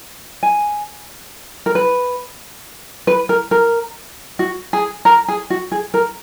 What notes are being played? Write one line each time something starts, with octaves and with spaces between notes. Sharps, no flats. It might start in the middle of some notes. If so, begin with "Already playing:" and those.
G#5
A#4
B4
B4
A#4
A#4
F#4
G#4
A#4
G#4
F#4
G#4
A#4